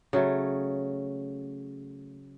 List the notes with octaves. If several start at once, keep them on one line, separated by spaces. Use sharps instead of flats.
C#3 F#3 A3